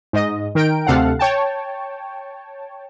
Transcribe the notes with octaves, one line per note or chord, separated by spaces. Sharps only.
G#2 D#5
D#3 A#4 G5 D7
D2 C3 A4 F5 F#5
C#5 G5 A5